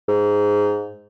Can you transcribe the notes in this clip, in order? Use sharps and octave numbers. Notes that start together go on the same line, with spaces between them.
G#2